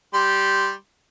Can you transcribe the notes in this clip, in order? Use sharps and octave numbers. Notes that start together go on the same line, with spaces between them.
G3 C6